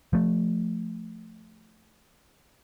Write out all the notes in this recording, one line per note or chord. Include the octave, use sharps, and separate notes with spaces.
F3 A3